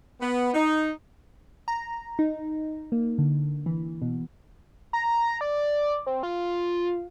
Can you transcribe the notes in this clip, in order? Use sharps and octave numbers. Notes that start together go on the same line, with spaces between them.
B3
D#4
A#5
D#4
A#3
D3
E3
B2
A#5
D5
C4
F4